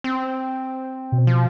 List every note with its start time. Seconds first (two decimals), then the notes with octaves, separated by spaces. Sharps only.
0.04 C4
1.12 B2
1.27 F3